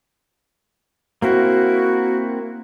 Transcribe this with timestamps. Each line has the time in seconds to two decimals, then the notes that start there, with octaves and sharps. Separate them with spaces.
1.22 A#3 C4 E4 F#4